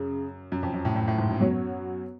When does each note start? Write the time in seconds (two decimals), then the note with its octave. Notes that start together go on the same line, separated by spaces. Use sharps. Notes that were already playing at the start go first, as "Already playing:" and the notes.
Already playing: F#2 C#3
0.52 F#2
0.63 F2
0.74 F#2
0.85 A2
0.96 A2
1.08 A2
1.18 G#2
1.29 F#2
1.40 F#3 B3 F#4 C#5